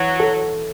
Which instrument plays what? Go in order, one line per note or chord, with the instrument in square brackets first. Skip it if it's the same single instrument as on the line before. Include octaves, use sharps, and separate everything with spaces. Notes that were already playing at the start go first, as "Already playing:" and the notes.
Already playing: [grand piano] E3 C#5 [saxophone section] F#3
[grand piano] A4